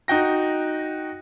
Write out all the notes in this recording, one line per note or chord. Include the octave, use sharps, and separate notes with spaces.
D#4 F#4 G5 A#6